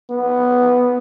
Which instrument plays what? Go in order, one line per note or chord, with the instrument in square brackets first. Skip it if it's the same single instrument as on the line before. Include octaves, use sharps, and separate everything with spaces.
[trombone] B3